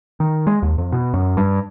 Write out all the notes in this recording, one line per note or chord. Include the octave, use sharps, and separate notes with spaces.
D#3
G#3
D#2
F2
B2
F#2
G2